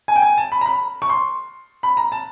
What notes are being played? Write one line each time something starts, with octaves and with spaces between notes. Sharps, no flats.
G#5
G5
G#5
A5
B5
A#5
B5
C#6
C6
B5
A#5
A5